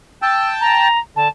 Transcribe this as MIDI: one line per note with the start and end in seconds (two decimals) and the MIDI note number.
0.22 0.88 79
0.22 0.88 81
0.22 0.48 88
0.61 0.99 82
1.16 1.28 50
1.16 1.28 81